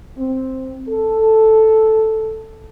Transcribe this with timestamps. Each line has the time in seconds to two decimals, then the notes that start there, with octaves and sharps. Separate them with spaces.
0.18 C4
0.89 A4